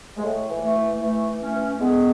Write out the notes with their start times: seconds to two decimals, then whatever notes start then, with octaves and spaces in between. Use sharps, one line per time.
0.18 G#3
0.24 A2 A3
0.50 E3
0.62 A3
0.76 E3
1.02 E3 A3
1.28 E3
1.41 A3 C#4
1.55 E3
1.80 D3 G#3 B3